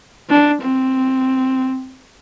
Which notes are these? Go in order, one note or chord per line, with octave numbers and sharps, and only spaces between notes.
D4
C4